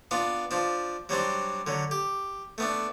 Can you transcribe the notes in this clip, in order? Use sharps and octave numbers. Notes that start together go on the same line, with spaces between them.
B3 D4 F4
F3 D4
F#3 G3 C4 D4
D3 F#3
G4
A3 B3 D4